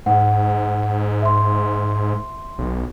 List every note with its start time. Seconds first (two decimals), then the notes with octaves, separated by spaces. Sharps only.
0.06 G#2 F#5
1.22 E5 C6
2.58 B1